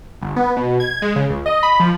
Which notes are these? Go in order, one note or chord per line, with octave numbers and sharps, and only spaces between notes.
G1
B3
B2
G#6
G#3
C#3
C#2
D#5
B5
F3